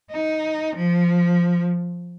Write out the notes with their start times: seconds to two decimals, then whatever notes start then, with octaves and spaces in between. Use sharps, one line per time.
0.11 D#4
0.75 F3